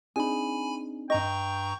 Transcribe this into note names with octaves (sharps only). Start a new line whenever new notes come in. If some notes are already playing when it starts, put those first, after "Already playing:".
C4 D4 D#4 G#4 G#5 B5
G2 D#5 G5 A#5 C#6